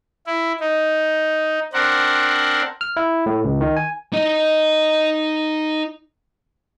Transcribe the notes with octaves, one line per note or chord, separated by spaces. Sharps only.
E4
D#4
C4 D4 A#4 F#5
F6
E4
A2
C#2
D#3
G#5
D#4 D#5